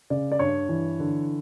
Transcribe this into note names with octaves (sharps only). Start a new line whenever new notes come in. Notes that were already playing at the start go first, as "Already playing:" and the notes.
C#3 D5
D5
G2 C#5
E3
D3